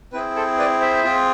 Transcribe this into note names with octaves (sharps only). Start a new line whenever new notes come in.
C4 E4 G#4 B4
A4 C5
B4 D5
C5 E5
C4 F4 G#4